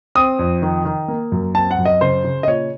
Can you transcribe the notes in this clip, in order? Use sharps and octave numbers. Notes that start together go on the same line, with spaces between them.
C4 D#6
F2
D#3
D#3
A#3
F#2
C4 A5
F#5
F#2
D#5
C#3 C5
C#3
D#5
A#2 C#5